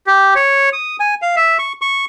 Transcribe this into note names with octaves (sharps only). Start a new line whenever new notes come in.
G4
C#5
D#6
G#5
F5
E5
C#6
C#6